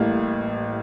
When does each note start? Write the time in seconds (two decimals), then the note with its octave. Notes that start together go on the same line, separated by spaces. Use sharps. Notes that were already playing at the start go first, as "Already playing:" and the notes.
Already playing: A1 A2 G3 A#3